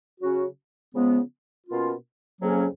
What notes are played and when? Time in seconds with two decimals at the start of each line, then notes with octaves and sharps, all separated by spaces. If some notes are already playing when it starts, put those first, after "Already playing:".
0.20 C#3 F#3 C#4 F#4
0.94 C#3 F3 G#3 B3
1.67 B2 A#3 C#4 F4
2.40 F2 C#3 F#3 A#3 C#4